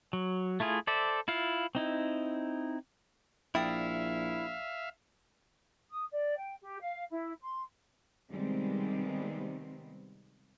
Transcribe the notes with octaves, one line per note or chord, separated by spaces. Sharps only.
F#3
A3 E4 F4 G#4
A4 C5 D5 E5
E4 F4 F5
C4 D#4 E4
A#1 E4 D5 E5 F5 G5 D#6
D#6
D5
G5
G4
F5
E4
C6
C3 D#3 G3 G#3 B3 C4